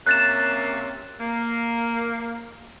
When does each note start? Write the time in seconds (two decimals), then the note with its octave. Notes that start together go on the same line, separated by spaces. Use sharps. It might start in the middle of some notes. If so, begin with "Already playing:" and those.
0.06 C3 A#3 C#4 F#6 A6 E7
1.20 A#3